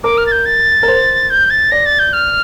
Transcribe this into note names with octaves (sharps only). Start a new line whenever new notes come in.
A#4 D6
F6
A6
G6
A6
A#4
C5
G6
A6
D5 A#6
A6
G6
F6